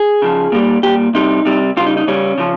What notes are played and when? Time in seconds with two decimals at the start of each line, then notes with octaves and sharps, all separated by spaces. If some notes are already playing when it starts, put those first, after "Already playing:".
Already playing: G#4
0.22 C#3 F3
0.52 A#2 G3
0.83 A#2 G3 G4
1.15 C3 G3 D#4
1.45 C3 G3
1.77 C#3 F4
1.80 G3
1.87 D#4
1.97 D#4
2.07 C#3 G3 C#4
2.38 C#3 F3